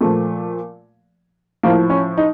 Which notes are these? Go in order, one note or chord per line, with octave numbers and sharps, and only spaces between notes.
A#2 F3 A3
A2 F3 A#3
C#4
D#4